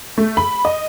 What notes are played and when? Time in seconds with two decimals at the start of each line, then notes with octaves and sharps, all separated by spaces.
0.18 A3
0.37 B5
0.65 D#5